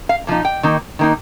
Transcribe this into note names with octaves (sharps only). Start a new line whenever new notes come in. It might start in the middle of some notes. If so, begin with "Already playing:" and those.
F5
A#2 F3 D#4
G5
D#3 A#3 D#4
D#3 A#3 D#4